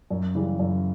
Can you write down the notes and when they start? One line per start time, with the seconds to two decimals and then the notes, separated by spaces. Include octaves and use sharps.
0.10 F#2
0.35 C#3 E3 G3
0.59 F#2